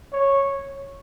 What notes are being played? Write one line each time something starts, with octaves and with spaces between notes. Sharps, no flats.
C#5